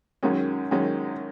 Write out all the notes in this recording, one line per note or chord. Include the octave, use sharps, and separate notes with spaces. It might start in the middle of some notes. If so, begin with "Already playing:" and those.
F#2 D#3 G#3 C#4
F#2 D#3 G#3 C#4